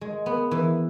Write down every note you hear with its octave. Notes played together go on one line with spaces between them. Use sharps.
G#3
B3
E3